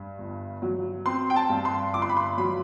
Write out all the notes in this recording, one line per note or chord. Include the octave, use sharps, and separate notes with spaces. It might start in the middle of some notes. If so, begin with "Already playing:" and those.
Already playing: G2
G1
F#3
C4 C6
G5
A5
G2
C6
G1 D6
C6
B5
C6
F#3 B5